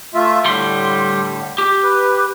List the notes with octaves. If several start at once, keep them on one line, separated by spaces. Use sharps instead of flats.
A3 F4 E5
A2 D3 G3 C6
G4
B4